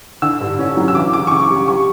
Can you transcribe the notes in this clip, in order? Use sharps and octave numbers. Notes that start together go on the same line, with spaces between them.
D3 E6
G2
C#4
F#3
E6
E3 D6
C#3 D6
C#6
C#3 D6
G3
G3 C#6